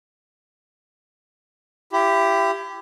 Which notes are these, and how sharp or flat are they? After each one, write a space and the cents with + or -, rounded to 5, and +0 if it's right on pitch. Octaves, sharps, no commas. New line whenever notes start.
E4 +30 G4 +0